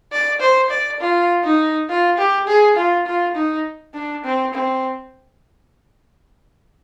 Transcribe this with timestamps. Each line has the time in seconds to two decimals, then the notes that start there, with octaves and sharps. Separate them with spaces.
0.12 D5
0.40 C5
0.70 D5
1.00 F4
1.43 D#4
1.89 F4
2.17 G4
2.48 G#4
2.76 F4
3.06 F4
3.35 D#4
3.94 D4
4.24 C4
4.53 C4